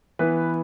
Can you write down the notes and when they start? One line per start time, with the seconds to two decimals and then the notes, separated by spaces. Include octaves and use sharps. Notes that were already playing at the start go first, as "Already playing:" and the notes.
0.19 E3 B3 B4